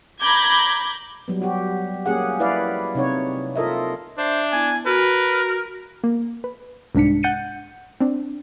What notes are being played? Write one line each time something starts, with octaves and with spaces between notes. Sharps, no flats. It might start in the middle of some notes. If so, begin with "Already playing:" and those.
A#5 B5 D6 G6 G#6
F#3 G3 B3
F#4 G4
A#3 C#4 G4 G#4 F#5
E4 B4 D5 F5
C3 D#4 C#5
F4 A4 A#4 D#5 E5
D4 C5 E5
B3 E4 G#5
F#4 A#4 B4
A#3
B4
C2 G#2 D4 B6 C#7
F#5 G6 A6 C#7 D#7
C4 D4